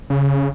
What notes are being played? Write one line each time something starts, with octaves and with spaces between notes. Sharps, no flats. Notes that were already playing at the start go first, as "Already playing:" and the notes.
C#3